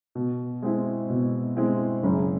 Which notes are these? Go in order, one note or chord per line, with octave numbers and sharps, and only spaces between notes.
B2
G#3 C4 E4
B2
G#3 C4 E4
F#1